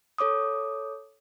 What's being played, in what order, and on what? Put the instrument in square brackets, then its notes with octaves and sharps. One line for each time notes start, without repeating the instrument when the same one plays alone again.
[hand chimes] A4 C#5 D6 D#6